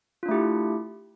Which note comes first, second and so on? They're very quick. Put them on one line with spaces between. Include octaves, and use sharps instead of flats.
F4 D4 A3 G4 E4